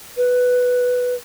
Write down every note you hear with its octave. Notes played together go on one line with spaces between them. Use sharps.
B4